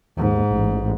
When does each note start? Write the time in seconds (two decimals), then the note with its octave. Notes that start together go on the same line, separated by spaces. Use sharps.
0.17 D#2 G#2
0.51 A1